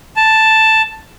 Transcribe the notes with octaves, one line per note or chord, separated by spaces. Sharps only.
A5